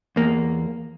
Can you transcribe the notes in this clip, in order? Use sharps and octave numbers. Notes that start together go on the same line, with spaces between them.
E2 A#3